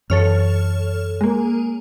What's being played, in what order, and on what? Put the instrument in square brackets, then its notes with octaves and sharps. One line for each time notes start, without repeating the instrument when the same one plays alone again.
[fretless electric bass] F#2 E3 [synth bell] A4 C#5 F6
[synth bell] G#3 A#3